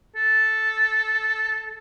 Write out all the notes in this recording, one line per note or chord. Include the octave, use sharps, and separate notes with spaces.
A4